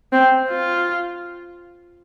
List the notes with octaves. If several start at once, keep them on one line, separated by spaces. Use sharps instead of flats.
C4
F4